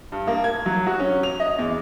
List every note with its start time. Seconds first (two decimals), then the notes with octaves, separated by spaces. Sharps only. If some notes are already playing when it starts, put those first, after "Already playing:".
0.12 G2
0.27 A#3
0.44 G#6
0.66 F#3
0.86 F#4
0.99 C#4
1.23 F7
1.40 D#5
1.58 E2